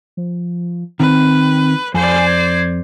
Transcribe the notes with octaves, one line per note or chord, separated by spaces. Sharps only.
F3
D#3 C4 B4
F2 C5 D5 G#5
G#6